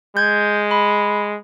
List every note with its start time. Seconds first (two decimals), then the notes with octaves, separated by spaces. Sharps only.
0.17 G#3 G6 G#6
0.71 B5